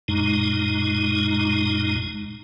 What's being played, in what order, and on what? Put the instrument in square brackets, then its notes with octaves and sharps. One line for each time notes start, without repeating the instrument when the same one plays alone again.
[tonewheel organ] F#2 A#2 G#3 D#4